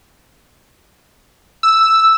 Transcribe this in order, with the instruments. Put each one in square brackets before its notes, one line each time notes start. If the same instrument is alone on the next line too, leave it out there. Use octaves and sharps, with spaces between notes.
[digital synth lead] E6